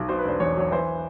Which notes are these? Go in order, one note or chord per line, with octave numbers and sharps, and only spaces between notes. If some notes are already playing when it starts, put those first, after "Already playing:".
Already playing: B1
B2 C5
B4
E1 C5
E2 C#5
F#3 C#5
E3 C5